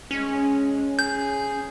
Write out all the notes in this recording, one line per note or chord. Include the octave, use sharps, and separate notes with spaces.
G#3 C#4
G#4 G6